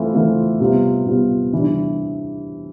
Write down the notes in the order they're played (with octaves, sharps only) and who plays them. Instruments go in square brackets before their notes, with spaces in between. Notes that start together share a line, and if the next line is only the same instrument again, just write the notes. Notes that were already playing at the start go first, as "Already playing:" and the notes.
Already playing: [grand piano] E3 A3 C4 F4
E3 A3 C4 F4
C3 G3 B3 F4
C3 G3 B3 F4
C3 E3 G3 D4